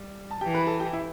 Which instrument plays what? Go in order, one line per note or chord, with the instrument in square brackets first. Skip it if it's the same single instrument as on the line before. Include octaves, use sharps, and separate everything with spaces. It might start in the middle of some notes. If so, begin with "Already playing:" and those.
Already playing: [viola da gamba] G3
[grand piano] A5
[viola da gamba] E3 [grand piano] G4 G5
[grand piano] B4 B5
A4 A5
G4 G5
E4 E5